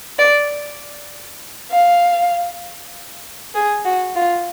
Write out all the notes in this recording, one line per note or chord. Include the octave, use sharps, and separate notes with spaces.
D5
F5
G#4
F#4
F4